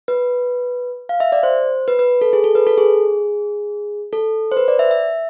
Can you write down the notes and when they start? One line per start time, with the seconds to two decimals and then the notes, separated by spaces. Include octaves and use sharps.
0.08 B4
1.09 F5
1.20 E5
1.32 D5
1.43 C5
1.88 B4
1.99 B4
2.21 A4
2.33 G#4
2.44 A4
2.55 B4
2.67 A4
2.78 G#4
4.13 A4
4.52 C5
4.57 B4
4.68 D5
4.79 E5
4.91 E5